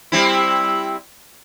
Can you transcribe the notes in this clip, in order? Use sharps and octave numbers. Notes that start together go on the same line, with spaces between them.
G3 C4 E4